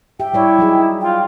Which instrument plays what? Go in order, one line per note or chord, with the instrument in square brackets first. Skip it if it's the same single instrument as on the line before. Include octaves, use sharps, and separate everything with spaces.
[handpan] G4 E5 [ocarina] G5
[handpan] G3 C#5 D5 [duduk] E4
[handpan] F#3 D#4 G#4
[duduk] F4 [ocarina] G5